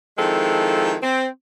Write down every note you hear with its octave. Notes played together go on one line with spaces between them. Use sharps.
D#3 F3 G#3 C4 E4 A4
C4